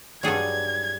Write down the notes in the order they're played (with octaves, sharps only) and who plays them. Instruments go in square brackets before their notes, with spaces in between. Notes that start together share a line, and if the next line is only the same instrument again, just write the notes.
[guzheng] G2 G3 [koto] F#3 G#4 A4 [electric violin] G#6